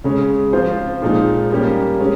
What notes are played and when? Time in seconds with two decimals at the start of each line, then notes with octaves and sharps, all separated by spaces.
0.04 C#3 G#3 C#4
0.53 F3 C4 F4 C5
1.02 A#2 F3 G#3 D#4
1.51 G3 A#3 C#4 G4
2.00 G#3 C#4